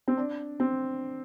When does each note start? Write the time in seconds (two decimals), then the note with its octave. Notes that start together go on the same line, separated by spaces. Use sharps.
0.08 C4
0.17 D4
0.60 C4